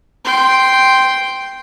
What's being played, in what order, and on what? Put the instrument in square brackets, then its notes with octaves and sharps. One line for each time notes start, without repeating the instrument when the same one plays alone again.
[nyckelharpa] G5 C6